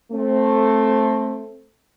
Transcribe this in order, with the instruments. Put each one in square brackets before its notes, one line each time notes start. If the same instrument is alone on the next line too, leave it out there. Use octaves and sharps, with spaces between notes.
[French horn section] A3 C4